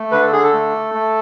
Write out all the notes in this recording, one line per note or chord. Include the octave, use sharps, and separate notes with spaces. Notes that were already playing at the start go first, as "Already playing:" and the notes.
Already playing: A3
D3 B4
A4
G#4
A4
A3
A3